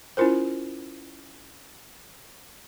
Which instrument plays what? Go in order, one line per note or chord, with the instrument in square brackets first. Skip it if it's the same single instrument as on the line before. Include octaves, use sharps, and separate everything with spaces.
[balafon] C#4 E4 F4 A#4 C5